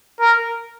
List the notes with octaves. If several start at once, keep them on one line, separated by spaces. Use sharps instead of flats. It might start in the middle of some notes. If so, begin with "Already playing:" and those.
A#4